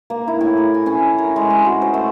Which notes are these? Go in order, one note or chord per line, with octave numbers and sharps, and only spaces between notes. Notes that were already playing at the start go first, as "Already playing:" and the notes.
A#3
E4
A2
A#4
G#5
C#4
A#4
G#3
G#4
F#4
C5
A3